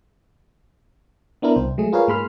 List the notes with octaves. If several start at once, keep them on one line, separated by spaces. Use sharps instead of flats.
B3 D4 E4 A#4
C2 C5
F#3 G#3 A3 G#4
F4 G#4 A#4 B4 C#5 F5
G#2 A#3 G#4 B5 C6 F6